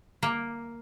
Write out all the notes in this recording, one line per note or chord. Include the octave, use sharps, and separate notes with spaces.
A#3